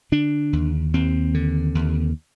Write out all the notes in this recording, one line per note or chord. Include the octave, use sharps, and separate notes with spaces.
D3 D4
D#2
D#2 C4
D3
D#2